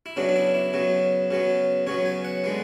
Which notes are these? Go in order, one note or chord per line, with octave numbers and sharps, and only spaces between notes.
E4
C#3 F#3 B3 D4
D4
E4
E4
C#3 F#3 B3
C#3 F#3 B3
C#3 F#3 B3 C#5
G#5
F#5
D3 G#3 B3